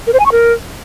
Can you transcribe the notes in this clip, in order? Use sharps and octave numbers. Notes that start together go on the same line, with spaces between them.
A#4
C5
G#5
C#6
A#4